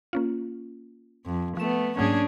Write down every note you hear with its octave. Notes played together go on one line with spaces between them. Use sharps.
A#3 C#4 F4
F2
F3 A3 B3 E7
G#2 F#3 A#3 C#4 D4 G#4